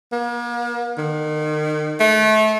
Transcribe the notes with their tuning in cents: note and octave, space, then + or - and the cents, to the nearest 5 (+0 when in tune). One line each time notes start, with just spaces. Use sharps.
A#3 +45
D#3 -30
A3 -25